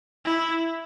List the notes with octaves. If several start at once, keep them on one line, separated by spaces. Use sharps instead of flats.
E4